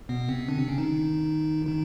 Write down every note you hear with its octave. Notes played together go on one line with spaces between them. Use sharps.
B2 B3
C3 C4
D3 D4
C3 C4
C#3 C#4
D#3 D#4
D#3 D#4